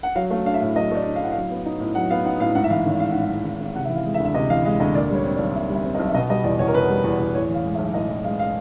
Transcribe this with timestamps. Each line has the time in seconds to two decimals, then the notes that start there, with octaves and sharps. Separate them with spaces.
0.03 F#5
0.16 F#3 F5
0.30 A3 F5
0.45 D4 F5
0.54 E5
0.60 A2 F5
0.76 F#3 D#5
0.91 A3 D5
1.06 D4
1.16 F5
1.21 A2 F#5
1.32 F#3 F5
1.50 B3
1.66 D#4
1.80 A2
1.95 F#3 F#5
2.10 B3 F5
2.25 D#4 F#5
2.40 A2 F5
2.55 G#2 F#5
2.64 E5
2.70 E3 F5
2.85 G#1
3.00 G#1 F5
3.12 G#2 F#5
3.21 F5
3.30 E3
3.45 G#1
3.60 G#1
3.76 C3 F#5
3.85 E5
3.90 E3
3.95 F5
4.06 G#3
4.14 E5
4.20 D2
4.25 E5
4.34 C3 D#5
4.50 E3 F5
4.65 G#3 F5
4.80 D2 D#5
4.94 A#2 D5
5.10 G3 C#5
5.25 C4
5.35 D5
5.39 B1
5.55 A#2 E5
5.70 G3
5.75 E5
5.84 C4
5.95 D#5
5.99 B1
6.09 E5
6.14 B2 D#5
6.29 G3 D#5
6.44 E2 D5
6.59 E2 C#5
6.68 A#4
6.74 B2 B4
6.89 G3
7.04 E2
7.20 E2
7.35 A2 C#5
7.50 E3 F5
7.65 G#3
7.75 E5
7.79 B1
7.94 A2 D#5
8.09 E3 E5
8.25 G#3 F5
8.39 F5